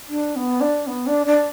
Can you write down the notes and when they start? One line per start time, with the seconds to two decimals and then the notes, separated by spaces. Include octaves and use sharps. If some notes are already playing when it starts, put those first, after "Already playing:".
0.09 D4
0.36 B3
0.61 D4
0.87 B3
1.07 D4
1.26 D4